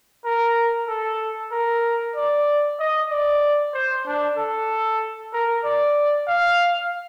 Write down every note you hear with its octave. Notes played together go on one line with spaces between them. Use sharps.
A#4
A4
A#4
D5
D#5
D5
C5
D4
A4
A#4
D5
F5